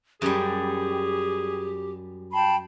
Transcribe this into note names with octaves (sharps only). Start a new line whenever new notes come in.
F#2 G3 G4 G#4
G5 A5 B5 C6